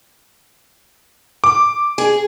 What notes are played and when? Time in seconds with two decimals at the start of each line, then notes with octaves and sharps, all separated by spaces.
1.44 D6
1.98 G#4